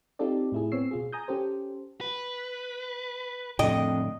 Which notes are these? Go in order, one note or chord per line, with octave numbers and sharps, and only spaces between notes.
C4 D#4 F4 G4 A4 D5
A2 E4 G#4
A2 B3 C4 C#5 E6 C7
B2 F4 G#4
G#5 A#5 D#6 G6
C#4 G4 A4 C5
B4
F2 A2 D3 D#5 G5